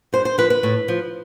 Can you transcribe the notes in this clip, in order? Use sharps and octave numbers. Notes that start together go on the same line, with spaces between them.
G2 C5
C5
F3 B4
B4
A2
F3